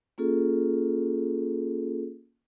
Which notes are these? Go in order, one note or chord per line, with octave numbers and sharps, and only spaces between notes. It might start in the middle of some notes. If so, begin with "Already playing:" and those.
A#3 C#4 F4 G#4 A4